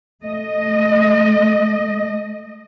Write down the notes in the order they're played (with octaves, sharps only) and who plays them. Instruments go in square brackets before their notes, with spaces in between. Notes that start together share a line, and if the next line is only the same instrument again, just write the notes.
[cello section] A3 D#5